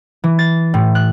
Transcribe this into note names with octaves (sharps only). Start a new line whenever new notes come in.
E3
A6
A2
F#6